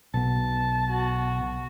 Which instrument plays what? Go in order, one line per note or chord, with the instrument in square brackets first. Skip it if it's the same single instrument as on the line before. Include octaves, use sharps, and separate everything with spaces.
[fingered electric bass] B1 B3 [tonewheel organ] B2 [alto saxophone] A5
[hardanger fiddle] F#4